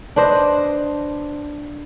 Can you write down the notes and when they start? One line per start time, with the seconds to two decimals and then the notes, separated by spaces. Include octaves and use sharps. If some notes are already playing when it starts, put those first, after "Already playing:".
0.16 D4 B4 C5 D#5